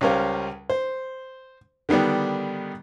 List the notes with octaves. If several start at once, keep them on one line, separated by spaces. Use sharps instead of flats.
C#2 G3 C#4 A#4 C5 F5
C5
D3 D#3 G3 B3 D4